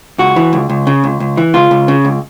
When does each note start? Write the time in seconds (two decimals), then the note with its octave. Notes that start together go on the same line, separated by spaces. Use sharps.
0.18 C#2 F#4
0.36 E3
0.53 C#2
0.69 C#2
0.87 C#3
1.04 C#2
1.20 C#2
1.37 E3
1.54 C#2 F4
1.71 C#2
1.88 C#3
2.05 C#2